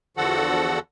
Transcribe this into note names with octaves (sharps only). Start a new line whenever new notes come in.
E2 D3 F3 F#4 A4 F#5